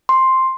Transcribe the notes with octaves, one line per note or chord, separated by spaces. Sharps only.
C6